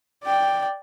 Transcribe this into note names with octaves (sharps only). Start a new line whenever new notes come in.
D5 G5